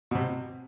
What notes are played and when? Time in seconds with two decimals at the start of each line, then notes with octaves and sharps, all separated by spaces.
0.11 B2
0.15 C3